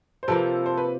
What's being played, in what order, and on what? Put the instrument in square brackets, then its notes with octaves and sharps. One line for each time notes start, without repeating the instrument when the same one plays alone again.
[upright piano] C5
[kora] C3 F3 A#3 [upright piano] A4 B4
[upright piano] C5
B4